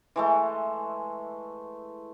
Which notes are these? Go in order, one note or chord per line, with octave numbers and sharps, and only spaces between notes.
E3 G#3 A3